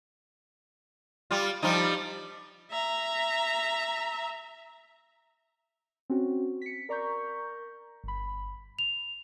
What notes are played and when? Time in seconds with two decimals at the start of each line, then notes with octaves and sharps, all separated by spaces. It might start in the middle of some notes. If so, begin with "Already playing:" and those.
1.31 G3 F4
1.63 F3 G3 D#4
2.71 E5 A#5
6.10 C4 C#4 F#4
6.62 B6 C#7
6.89 A#4 D5 A#5 C#6 G6
8.04 G1 B5
8.79 F7